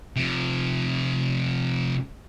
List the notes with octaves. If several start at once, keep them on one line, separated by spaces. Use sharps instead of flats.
C3 F3